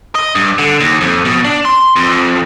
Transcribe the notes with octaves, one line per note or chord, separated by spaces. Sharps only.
D#5
G2
D3
D#2
F2
B2
D4
C6
F2